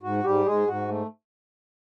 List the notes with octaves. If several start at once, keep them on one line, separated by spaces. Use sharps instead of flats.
G#2 F#4
G#2 G3 G4
G#2 G#3 G#4
G#2 F#4
A3